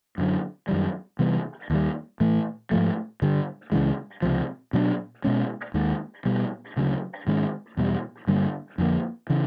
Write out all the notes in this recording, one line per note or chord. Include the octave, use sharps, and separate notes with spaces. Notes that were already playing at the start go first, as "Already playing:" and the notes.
F#2 D3 F#3
F#2 D#3 G3
C3 E3 G3 B3
D#2 D#3 G3
A2 E3 A3
G#2 F3 A3
G2 D3 G3
C#2 C#3 E3 G#3
C#2 C3 F3
B2 F#3 B3 D4
B2 G#3 C#4
D#2 D#3 G#3
B2 G3 B3
D2 C#3 F#3
G#2 D#3 G#3 C#4
E2 B2 G3
G2 D3 G3 A#3
F2 D3 F3 A#3
C#3 E3